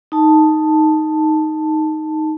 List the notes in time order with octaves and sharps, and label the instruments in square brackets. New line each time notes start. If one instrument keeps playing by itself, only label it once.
[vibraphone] D#4 A5